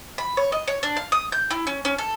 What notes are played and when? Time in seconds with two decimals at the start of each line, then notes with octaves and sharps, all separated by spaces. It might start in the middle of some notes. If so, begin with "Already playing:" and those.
0.18 B5
0.37 C#5
0.52 D#5
0.68 C#5
0.83 D4
0.97 F5
1.12 D#6
1.32 G6
1.51 E4
1.67 C#4
1.85 C#4
1.98 A4